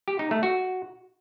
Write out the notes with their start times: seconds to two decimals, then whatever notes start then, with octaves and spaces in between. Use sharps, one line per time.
0.08 G4
0.19 D#4
0.31 A3
0.43 F#4